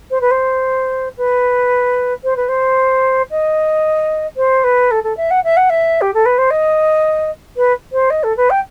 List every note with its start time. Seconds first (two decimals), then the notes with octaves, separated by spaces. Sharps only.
0.10 C5
0.21 B4
0.31 C5
1.17 B4
2.24 C5
2.36 B4
2.48 C5
3.30 D#5
4.36 C5
4.64 B4
4.91 A4
5.03 A4
5.17 E5
5.30 F#5
5.44 E5
5.56 F#5
5.69 E5
6.01 G4
6.14 A4
6.25 B4
6.38 C5
6.50 D#5
7.56 B4
7.92 C5
8.10 D#5
8.23 A4
8.37 B4
8.50 G5